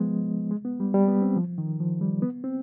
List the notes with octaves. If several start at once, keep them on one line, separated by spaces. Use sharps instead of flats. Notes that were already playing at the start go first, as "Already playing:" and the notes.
Already playing: F3 G#3 B3
G#3
B3
G3
G3
B3
C4
F3
D#3
F3
G3
B3
C4